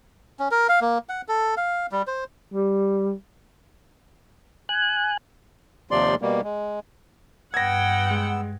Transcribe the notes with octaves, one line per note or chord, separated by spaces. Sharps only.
C#4
A#4
F5
A#3
F#5
A4
F5
G3
C5
G3
G#5 F#6
D#2 C3 F3 D5 C6
B2 G3 A#3
G#3
G2 B3 F#5 G5 E6 G#6 A#6
G#3